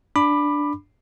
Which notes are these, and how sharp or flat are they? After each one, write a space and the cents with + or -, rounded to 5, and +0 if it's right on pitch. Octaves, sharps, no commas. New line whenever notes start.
D4 +0 B5 +0 D6 +20